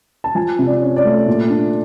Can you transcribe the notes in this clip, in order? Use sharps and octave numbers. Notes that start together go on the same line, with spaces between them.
A5
F3 G#5
C3
D5
C#4
D5
A3
A#2
D4